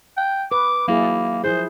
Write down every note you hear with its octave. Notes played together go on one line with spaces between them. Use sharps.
G5
B4 D6
F#3 A#3 E4 G#4
F3 E4 G#4 C5